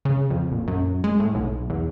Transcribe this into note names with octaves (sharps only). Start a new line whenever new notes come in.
C#3
F2
A#1
F#2
G#3
A2
B1
E2